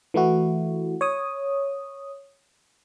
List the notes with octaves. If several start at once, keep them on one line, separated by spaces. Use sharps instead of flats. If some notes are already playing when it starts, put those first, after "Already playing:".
E3 A3 E4 F#4
C#5 D#6